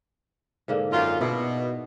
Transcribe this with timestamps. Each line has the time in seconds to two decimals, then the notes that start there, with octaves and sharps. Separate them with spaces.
0.68 G#2 D3 A#3
0.92 F#2 F4 A#4 D5
1.20 B2 D#4 E4 D5